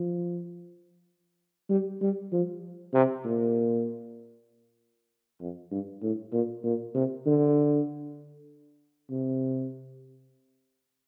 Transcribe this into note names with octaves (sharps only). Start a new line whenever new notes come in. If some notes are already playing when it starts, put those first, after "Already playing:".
Already playing: F3
G3
G3
F3
C3
A#2
F2
G2
A2
A#2
A#2
C3
D3
C3